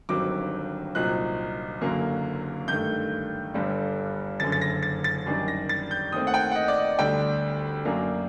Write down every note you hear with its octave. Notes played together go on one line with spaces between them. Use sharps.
G1 G2 D#3 F#3 C4 D6
C2 A#2 F#3 C4 D#4 F#6
F#1 F#2 D3 F#3 A#3
G2 D#3 A3 G6
G1 G2 D3 G3
F#1 F#2 D3 A6
A6
A#6
A6
A6
F#2 D#3 G3 D4
A#6
A6
G6
D#2 D#3 A3 C4 D#6
F#5
G5
F#5
D#5
D5
D#5
D2 D3 G3 D4 G5
F#2 F#3 A#3 D4